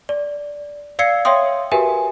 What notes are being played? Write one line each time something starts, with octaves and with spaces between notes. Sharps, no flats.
D5
D5 F5 E6 G#6 C7 C#7
C#5 E5 F5 G5 C6 D#6
F#4 G4 A#4 B4 E5 G#5